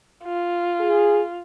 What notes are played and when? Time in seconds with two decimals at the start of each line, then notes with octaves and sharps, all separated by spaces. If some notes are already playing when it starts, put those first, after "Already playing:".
0.25 F4
0.80 G#4